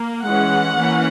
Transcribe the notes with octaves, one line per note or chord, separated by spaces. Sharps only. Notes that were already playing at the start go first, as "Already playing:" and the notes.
Already playing: A#3
E3 G#3 C#4 F#5
E3 A#3 C#4